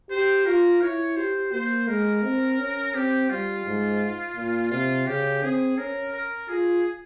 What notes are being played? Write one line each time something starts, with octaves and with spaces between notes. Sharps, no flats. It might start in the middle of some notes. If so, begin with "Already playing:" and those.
G4 C5
F4 A#4
E4 C#5
G4 C5
A#3 C5
G#3 A#4
C4
C#4
C4 G4
G3 F4
G#2
A#2
C3 F4
C#3 G4
C4 G#4
C#4 A#4
A#4
F4 G#4